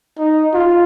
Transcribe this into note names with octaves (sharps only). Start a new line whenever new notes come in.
D#4
F4